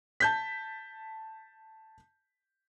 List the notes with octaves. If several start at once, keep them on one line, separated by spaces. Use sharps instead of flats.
A5 G6 B6